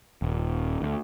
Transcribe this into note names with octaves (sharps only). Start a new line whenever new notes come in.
D#1
D2